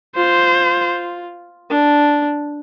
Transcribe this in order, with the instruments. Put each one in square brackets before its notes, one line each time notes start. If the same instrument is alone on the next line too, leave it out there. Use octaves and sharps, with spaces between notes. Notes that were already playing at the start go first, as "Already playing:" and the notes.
[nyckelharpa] F4 [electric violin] C5
[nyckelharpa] D4